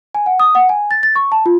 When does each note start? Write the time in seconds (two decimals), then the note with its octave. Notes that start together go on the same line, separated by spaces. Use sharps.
0.15 G#5
0.26 F#5
0.40 D#6
0.55 F#5
0.69 G#5
0.91 A6
1.03 A6
1.16 C#6
1.32 A5
1.46 F4